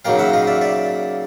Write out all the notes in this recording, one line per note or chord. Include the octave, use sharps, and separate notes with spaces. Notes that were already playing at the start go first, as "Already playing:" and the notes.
C#3 F#3 A#3 D#4 F5 G5
E5 F#5
D#5 F5
D5 E5
D5 E5